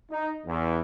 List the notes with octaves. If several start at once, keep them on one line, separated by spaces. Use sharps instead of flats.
D#4
E2